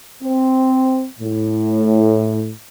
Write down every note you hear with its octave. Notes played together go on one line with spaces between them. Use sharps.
C4
A2